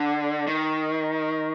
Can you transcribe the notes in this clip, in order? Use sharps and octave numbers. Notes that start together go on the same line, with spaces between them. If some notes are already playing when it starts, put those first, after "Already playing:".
Already playing: D3
D#3